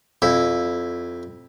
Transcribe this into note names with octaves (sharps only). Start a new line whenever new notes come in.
F2 E4